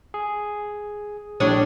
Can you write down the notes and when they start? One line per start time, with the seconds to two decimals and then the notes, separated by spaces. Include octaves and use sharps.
0.14 G#4
1.40 A#1 A2 G3 D4 C#5 D#6